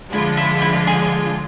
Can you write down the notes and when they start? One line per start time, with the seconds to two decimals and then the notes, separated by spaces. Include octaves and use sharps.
0.12 D3 F3 G#3 D4 E4 F4
0.37 E4
0.62 E4
0.87 G#4